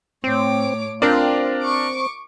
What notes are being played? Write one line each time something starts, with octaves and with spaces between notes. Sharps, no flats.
A2 C4 C#5 D6
C4 D4 F4 A#4 D5
C#6 D6